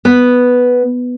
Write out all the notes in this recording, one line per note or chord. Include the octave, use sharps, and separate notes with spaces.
B3